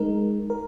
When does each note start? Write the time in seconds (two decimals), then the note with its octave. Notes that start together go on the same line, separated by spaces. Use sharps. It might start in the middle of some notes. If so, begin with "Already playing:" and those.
Already playing: G#3 D#4 A#4
0.50 A#4